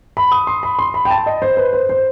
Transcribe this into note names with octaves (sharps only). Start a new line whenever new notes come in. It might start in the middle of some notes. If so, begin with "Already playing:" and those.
B5
D#6
C6
B5
C6
B5
G5
A5
D#5
C5
B4
C5
C5